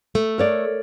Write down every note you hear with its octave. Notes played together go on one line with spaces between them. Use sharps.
A3
A#4 C#5 D5